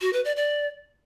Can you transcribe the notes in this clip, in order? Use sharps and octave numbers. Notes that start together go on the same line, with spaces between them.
F#4
B4
D5
D5